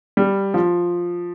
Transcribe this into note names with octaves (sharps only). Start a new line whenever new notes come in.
G3
F3